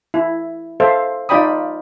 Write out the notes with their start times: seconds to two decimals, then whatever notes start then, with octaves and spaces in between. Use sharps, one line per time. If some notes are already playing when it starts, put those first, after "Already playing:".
0.14 E4
0.80 A4 C5 E5 F5
1.29 D#4 F4 D5 G5 B5 D#6